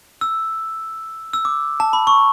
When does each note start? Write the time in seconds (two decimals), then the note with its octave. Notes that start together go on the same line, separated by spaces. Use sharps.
0.21 E6
1.33 E6
1.45 D6
1.80 A5
1.93 B5
2.07 C#6